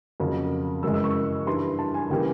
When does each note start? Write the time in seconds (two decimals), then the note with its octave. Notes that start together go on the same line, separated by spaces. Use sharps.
0.20 F2 C#3 F#3 A#3
0.83 F#2 C#3 E3 G#3 E6
0.94 E6
1.04 C#6
1.46 G2 E3 G3 C6
1.79 A5
1.94 G#5
2.10 C#3 E3 G3 A#3 G5